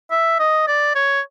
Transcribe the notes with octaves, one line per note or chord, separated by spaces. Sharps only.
E5
D#5
D5
C#5